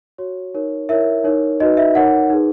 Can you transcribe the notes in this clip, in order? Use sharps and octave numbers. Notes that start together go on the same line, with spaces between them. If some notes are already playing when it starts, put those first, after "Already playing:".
F#4 C#5
D#4 A#4 C#5
E4 A#4 C#5 E5
D#4 A#4 C#5
D#4 F#4 B4 D#5
E5
D#4 A#4 C#5 F#5
D#4 G#4 B4